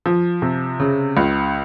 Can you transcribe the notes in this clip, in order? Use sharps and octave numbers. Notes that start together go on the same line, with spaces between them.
F3
C3
C#3
C#2